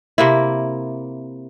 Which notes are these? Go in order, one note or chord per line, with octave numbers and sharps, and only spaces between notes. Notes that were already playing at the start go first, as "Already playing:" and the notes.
C3 A#3 E4